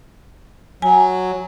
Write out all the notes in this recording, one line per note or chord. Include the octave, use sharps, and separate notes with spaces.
F#3 G#5